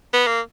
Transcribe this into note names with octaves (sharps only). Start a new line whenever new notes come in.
B3
A#3